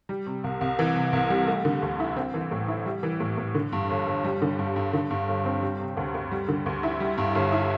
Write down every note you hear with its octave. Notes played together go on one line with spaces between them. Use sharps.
G3
C3
C2
C2
E3
C3
C2
G3
A3
D3
D2
E4
C4
E3
A2
E4
G3
E3
A2
A2
D3
G2
G1
G1
G3
D3
G2
G2
D3
G2
G1
C4
G3
C3
D2
D2
G3
D3
D2
E4
G3
G2
G1
E4